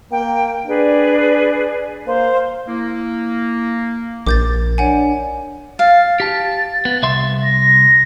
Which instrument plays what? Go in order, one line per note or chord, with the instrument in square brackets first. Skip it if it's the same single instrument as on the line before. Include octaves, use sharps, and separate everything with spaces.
[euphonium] A#3 [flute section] G5
[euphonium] D4 [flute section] G#4 B4 D5
[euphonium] A#3 [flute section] C5 F5
[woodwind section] A#3 [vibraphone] E4
[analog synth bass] A#1 [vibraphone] A#4 [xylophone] D6 G6 A6
[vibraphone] D4 D5 [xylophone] C#5 F#5 G#5
[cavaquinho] F5 [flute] A6
[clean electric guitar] G4 A5
B3
C2 E5 C6
[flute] A#6